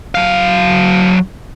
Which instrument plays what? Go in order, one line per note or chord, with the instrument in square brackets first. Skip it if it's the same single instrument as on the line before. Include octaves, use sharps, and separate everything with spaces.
[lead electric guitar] F#3 F5